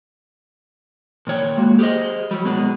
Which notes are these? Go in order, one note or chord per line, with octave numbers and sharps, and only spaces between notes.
A#2 D#3 C#5 G5
G#3 A#3 F#4
G4 G#4 C5 D#5
F#3 G3
B2 D#3 F#3 G#3 B3